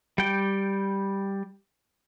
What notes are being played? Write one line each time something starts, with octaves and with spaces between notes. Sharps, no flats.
G3 G5